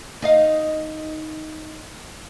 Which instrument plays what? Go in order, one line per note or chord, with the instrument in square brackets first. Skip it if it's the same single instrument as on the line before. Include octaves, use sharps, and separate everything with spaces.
[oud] D#4 D#5 F5